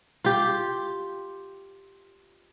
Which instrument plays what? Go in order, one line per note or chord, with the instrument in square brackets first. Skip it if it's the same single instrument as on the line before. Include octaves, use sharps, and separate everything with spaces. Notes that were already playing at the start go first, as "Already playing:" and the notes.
[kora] F4 G4